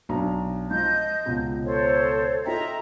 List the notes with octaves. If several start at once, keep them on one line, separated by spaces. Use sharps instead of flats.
B1 D4 A#5
F3 D#5 G6
C#2 B2
A4 C5 C#5
F4 A4 D#5 E5 G5 A#5